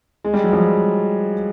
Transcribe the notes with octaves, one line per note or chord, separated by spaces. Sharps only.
G#3
G3
F#3
F3 G3